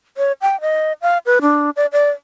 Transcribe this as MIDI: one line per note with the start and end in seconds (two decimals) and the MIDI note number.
0.17 0.32 73
0.42 0.60 79
0.61 0.93 75
1.02 1.18 77
1.26 1.39 71
1.42 1.70 62
1.76 1.86 74
1.92 2.10 74